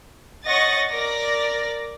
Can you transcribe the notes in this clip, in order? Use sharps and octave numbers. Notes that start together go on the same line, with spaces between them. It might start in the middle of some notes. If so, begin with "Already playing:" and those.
C#5 D#5 F#5 C#6 A6 A#6
A#4 D5 A#6